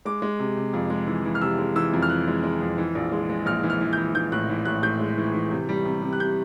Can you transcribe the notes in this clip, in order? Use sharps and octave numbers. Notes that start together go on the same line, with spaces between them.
G#3 D6
G#3
C3
C3
F2
G#3
E3
E3
F6
C3 E6
G#3
E3 E6
F2
F6
E3 F#6
G#3
G#3
F2
E3
A#1
G#3
G#3
A#1 F6
E3
F6
E3
E3 G6
E3 G6
A2 F#6
E3
A2 F#6
A2 G6
G#3
E3
E3
C3
G3
C3
C3
F#6
C3 G6